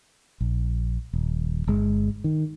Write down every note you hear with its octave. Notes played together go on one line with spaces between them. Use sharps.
A#1
D#1
G1 G#3
D#3